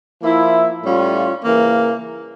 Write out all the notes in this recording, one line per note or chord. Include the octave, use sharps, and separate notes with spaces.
F3 A#3 E4
A2 G3 C#4 F4
C#3 E3 A#3